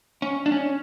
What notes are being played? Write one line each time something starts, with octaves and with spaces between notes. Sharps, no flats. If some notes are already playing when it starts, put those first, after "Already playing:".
C#4
D4
C#4